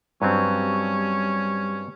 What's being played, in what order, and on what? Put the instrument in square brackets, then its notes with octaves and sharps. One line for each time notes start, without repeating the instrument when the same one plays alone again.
[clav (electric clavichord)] G2 F#3 C4 [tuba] G3 [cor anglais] C#4